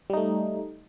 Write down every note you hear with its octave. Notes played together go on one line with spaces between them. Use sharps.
G3 A3 D#4